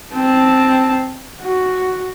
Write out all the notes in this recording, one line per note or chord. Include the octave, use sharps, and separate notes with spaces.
C4 A5
F#4